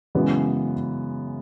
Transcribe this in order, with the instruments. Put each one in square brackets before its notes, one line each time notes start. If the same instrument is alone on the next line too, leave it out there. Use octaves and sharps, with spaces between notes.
[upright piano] F#2 C#3 E3 G#3 B3